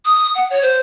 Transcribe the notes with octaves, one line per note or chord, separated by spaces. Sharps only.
D#6
F#5
C#5
C5